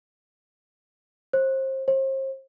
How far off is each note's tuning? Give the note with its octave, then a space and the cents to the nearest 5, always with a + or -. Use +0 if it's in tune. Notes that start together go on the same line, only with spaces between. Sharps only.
C5 +30
C5 +40